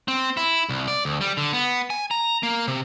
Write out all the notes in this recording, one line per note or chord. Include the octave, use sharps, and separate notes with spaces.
C4
E4
C2
D5
D2
G3
D3
B3
G#5
A#5
A#3
C3